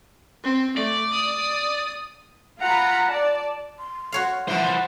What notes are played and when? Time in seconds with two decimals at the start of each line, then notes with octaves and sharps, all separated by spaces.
0.44 C4
0.77 A3 D5
1.12 D#6
2.61 F4 F#5 A#5 B5
3.09 D5 A5
3.79 C6
4.12 F#4 C#5 F5
4.48 E3 F3 E4 C5 F#5